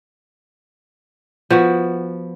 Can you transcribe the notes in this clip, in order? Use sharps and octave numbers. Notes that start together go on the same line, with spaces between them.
F3 B3 F#4 B4